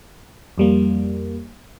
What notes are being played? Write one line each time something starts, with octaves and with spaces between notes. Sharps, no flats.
F2 G3 A#3